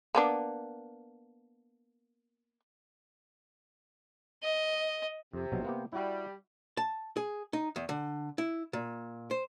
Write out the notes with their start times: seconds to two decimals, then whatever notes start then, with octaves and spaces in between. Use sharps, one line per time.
0.15 A#3 B3 D4
4.43 D#5
5.33 F2 C3
5.52 A#1 B2 F#3
5.65 A#3 B3 G4
5.93 G3 E4 F#4
6.77 A5
7.17 G#4
7.53 D#4
7.76 E2
7.89 D3
8.38 E4
8.73 A#2
9.31 C5